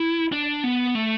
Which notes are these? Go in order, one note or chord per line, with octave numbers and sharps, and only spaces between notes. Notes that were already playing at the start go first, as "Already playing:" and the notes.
Already playing: E4
D4
B3
A3